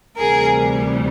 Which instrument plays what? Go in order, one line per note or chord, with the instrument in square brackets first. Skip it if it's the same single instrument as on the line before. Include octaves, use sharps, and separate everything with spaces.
[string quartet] D2 C3 E3 G3 G#4 A#4